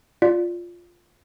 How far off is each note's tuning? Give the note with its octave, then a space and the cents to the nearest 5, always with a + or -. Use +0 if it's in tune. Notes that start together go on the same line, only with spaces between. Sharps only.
F4 +0 D5 +0